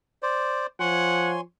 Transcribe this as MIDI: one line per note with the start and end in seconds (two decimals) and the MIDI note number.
0.23 0.66 72
0.23 0.66 74
0.80 1.40 53
0.80 1.41 73
0.80 1.31 78
0.80 1.41 80
0.80 1.41 84